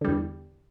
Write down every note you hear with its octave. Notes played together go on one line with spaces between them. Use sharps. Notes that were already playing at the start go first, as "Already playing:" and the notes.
E2 D3 G3